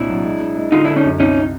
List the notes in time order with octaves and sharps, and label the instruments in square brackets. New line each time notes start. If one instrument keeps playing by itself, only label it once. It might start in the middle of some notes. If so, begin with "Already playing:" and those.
Already playing: [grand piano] C2 A#2 C4 [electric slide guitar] D4 E4
[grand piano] F#3
G#3
G#3
G#3
[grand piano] D3 [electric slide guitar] D#4 F4
[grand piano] D3 [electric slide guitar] D4 E4
[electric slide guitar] C#4 D#4
[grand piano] F#2
[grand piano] C2 [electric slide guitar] C#4 D#4